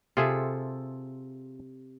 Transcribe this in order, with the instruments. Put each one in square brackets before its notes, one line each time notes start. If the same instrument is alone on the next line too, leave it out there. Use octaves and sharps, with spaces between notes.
[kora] C3 A4 [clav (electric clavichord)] F4 G#4 E5